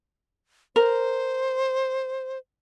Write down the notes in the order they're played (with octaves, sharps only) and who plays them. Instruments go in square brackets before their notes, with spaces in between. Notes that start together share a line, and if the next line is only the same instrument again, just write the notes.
[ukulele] A#4 [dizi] C5